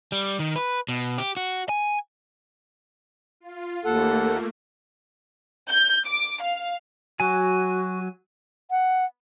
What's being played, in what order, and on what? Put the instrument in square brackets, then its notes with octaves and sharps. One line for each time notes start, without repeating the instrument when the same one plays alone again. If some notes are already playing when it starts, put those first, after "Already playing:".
[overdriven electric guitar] G3
D#3
B4
B2
G4
F#4
G#5
[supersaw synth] F4
[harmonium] D#2 A4 F#5 [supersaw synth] A3 A#3
[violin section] G6
D6
F5
[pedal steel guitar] F#3 G#5 [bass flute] F#4
[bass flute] F#5